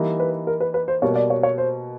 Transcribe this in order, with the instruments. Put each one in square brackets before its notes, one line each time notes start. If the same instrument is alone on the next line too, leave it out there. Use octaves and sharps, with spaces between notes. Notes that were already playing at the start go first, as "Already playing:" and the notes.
Already playing: [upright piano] E3 G3 A#3 D#4
[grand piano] B4
A#4
B4
B4
C5
[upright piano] B2 G3 A#3 [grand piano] C#5
[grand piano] D5
C#5
C#5
C5